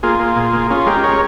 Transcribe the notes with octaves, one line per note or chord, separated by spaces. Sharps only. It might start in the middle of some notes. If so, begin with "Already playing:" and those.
A#3 F4 G#4
A#3
A#2
A#3
C#4 F4 G#4
G#3 G4 A#4
C#4 A#4 C#5